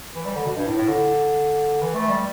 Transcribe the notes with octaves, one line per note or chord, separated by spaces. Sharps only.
E3
G3
D3
B2
G2
A2
A2
D3
E3
A3
G3